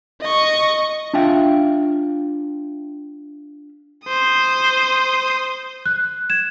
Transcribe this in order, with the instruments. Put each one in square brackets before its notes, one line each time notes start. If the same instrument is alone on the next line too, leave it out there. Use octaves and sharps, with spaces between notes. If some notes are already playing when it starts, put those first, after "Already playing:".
[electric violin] D#5 C#6
[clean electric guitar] D4 F4 E5 F5 G5
[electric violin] C5 D#6
[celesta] F#6
G#6 E7